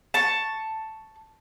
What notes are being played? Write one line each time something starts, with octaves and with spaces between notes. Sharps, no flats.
A5 C#6